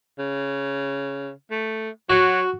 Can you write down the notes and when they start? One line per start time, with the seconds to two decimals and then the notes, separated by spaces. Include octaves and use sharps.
0.19 C#3
1.51 A3
2.10 F#3 F#4